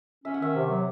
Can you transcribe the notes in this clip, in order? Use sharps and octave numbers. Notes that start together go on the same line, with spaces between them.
C#4 E5
F#5
D#3 E5
C3
F#3